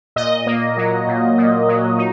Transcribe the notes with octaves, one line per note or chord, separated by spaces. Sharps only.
A#2 D#5
A#3
F#3
A#2
A#2
F#3
D#4